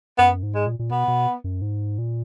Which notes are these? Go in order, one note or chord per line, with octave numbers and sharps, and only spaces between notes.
F#2 B3
G#2
G#3
A#2
A#2
B2 B3
B2
F#2
G#2
A#2